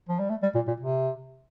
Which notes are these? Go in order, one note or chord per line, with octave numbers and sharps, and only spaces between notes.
F3
G3
A3
G3
A#2
A#2
C3